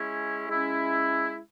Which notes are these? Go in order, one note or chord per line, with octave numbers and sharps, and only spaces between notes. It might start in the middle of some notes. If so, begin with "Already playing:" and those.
Already playing: G#3 C#4 E4
G#3 C#4 E4